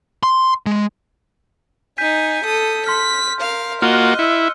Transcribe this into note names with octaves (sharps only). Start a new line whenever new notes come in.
C6
G#3
D#4 G#5 G6 B6 D#7
A4 D#6
C6 F6 B6
A#4 F5
A#3 F4 F#4 D#5 F6 F#6 G7
E4 E6 C#7